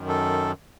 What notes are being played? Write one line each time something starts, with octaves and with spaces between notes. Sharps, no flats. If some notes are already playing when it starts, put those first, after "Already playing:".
Already playing: F#2 D#3
A4